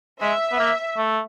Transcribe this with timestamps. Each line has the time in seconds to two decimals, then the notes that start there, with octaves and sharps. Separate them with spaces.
0.20 G#3 E5
0.52 B3
0.59 A#3
0.97 A3